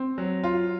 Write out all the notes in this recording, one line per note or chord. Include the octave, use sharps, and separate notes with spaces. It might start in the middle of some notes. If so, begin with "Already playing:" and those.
Already playing: C4
F#3
F4